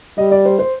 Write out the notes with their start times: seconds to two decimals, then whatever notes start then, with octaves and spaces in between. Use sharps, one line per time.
0.18 G3 D#5
0.31 D5
0.45 C5
0.59 C5